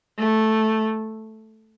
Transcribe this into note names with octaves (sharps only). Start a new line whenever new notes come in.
A3